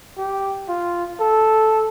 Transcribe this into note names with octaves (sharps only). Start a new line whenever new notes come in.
G4
F4
A4